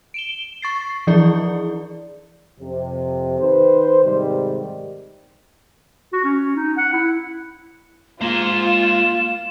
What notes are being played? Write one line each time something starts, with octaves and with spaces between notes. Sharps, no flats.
D7 E7 G7
C#6 A6 C7
E3 F3 E4 G#4 D5
F2 C3
D#3 B4 C5
G#2 C3 D#3 G3
F#4
C#4
D#4
F#5
E4
G#3 A#3 F4 A#5 E7